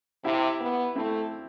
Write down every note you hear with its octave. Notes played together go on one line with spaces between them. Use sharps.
C3 E4 G4
B3
A3 C4 E4